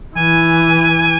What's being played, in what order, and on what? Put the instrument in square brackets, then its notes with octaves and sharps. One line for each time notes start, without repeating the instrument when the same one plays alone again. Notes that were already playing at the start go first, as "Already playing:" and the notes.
[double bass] E3 [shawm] G#5